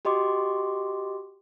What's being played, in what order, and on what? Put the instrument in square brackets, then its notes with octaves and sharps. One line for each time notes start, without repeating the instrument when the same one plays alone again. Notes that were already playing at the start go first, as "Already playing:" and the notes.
[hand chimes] F#4 G4 D#5 C6 D6